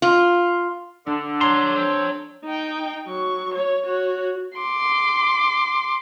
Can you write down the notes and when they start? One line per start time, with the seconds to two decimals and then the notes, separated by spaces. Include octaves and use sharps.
0.02 F4
1.07 D3 D4
1.41 C#5 A#5 C6
1.76 C4 A4 G5
2.45 D#4 G5
3.07 F#3 C#6
3.54 C#5
3.86 F#4 C#5
4.58 C6 D6